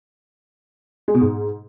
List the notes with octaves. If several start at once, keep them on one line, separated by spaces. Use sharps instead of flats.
G#3
B2
G#2